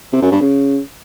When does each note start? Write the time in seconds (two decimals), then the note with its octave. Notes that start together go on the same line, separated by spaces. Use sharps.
0.12 C3
0.22 F#2
0.32 G2
0.41 C#3